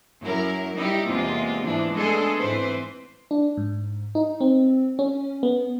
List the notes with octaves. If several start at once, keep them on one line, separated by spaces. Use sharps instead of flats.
F#2 E4 A#4
G3 D#4 E4 G4
E2 C3 G#3 A#3 F4
G#2 E3 F3 D4
G#3 A3 B3 D4 G#4 A4
G#2 E3 C4 B4 C5
D4
G#2
D#4
C4
C#4
B3